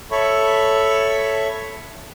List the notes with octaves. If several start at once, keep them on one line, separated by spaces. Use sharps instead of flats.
A4 C#5 E5 B5 C#6